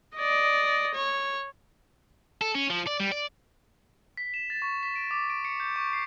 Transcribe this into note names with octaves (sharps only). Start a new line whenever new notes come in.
D5 D#5
C#5
A4
C#4
F3
D5
G3
D5
B6
E7
A6
C#6
B6
D7
D6
D7
C#7
G6
C#6
C7